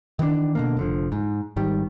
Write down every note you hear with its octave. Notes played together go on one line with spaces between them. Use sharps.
D#3 E3 A3 D4
B2 D3 A#3
F1 D3 F3
G#2
G#1 D#3 G3